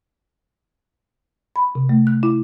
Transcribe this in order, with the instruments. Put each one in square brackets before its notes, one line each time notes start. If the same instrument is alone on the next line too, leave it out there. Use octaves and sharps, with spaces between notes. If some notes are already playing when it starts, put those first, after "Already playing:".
[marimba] B5
C3
A3
F#6
E4